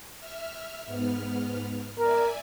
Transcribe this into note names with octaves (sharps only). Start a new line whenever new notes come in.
E5 F6
G#2 B3 F6
A#4 D5 E5 G#5